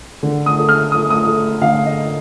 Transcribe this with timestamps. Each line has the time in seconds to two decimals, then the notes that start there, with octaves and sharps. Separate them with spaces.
0.23 D3
0.46 D#6
0.58 A3
0.69 F6
0.92 A3 D#6
1.10 D#6
1.27 A3
1.62 D3 F5
1.86 D#5